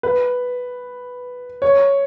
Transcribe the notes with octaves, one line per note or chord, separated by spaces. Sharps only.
B4
C#5